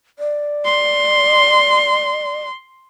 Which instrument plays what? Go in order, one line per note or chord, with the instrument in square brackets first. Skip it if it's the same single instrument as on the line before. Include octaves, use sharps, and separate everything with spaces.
[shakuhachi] D5
[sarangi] C6